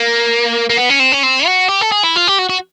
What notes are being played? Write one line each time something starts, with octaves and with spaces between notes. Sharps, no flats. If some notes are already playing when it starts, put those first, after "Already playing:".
Already playing: A#3
A#3
B3
C#4
C4
C#4
C4
F#4
G4
A4
G#4
E4
F4
G4
F#4
F#4